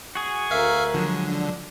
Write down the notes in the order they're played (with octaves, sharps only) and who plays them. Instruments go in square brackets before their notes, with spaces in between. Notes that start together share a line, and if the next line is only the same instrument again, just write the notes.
[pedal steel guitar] F#4 G#4
[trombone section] D2 A#4 [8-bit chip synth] E5 F5
[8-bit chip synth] D3 [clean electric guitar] F3 F#3 G#3
[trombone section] D4